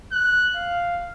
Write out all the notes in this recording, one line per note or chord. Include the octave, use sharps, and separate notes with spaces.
F#6
F5